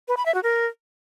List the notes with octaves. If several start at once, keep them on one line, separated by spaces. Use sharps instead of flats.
B4
B5
E5
F#4
A#4